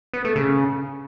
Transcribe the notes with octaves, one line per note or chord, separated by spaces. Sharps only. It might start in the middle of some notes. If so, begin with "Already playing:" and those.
B3
A3
C#3